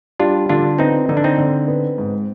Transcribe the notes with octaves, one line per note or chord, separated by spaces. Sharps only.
G3 D4 F4
D3 D4 F4
B3 C4 D#4
D3 D#4
D4
C4 D#4
D3
B3
G#2